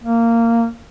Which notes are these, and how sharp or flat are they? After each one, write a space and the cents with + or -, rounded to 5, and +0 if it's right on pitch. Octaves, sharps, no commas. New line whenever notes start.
A#3 -15